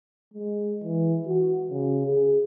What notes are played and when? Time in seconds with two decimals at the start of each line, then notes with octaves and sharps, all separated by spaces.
0.34 G#3
0.84 E3
1.27 F#4
1.71 C#3
2.06 G#4